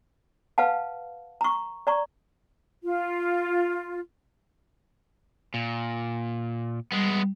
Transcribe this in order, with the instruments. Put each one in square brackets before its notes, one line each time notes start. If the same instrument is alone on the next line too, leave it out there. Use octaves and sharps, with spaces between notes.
[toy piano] B4 F5 F#5 A5
A#5 C#6
D5 A#5 C#6
[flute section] F4
[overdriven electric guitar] A#2
[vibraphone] G3 [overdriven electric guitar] G#3 B3